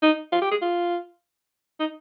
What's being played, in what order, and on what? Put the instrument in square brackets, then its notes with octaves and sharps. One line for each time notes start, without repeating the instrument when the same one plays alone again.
[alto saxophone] D#4
F4
G4
G#4
F4
D#4